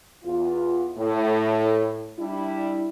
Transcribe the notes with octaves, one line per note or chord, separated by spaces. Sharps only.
E2 F4
A2
G3 D4 E4